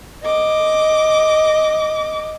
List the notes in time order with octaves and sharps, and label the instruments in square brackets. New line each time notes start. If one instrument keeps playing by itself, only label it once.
[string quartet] D#5 D6